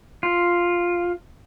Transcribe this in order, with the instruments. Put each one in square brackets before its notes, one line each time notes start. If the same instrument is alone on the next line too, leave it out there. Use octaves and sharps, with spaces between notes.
[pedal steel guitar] F4